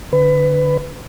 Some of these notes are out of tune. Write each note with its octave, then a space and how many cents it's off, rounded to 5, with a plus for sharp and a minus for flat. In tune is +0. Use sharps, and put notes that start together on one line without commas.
D3 +0 B4 +20